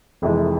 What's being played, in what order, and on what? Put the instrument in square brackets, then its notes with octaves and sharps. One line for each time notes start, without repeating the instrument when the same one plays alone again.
[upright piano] F1 F2 C3 E3 G#3